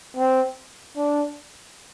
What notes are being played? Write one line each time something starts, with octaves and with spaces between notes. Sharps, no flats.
C4
D4